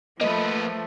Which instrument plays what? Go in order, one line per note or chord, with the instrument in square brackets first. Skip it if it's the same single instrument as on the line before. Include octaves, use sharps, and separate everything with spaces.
[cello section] F3 A3 [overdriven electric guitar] A#3 B4 [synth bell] D#5